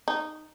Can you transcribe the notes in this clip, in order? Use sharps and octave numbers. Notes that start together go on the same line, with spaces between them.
D#4